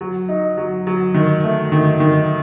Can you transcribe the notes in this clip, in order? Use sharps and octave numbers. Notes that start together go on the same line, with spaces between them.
F#3
D#4
F#3
F#3
D#3
A3
D#3
D#3